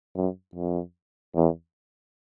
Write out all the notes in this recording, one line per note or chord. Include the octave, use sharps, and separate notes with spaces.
F#2
F2
E2